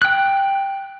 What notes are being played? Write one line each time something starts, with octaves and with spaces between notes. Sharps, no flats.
G5 F#6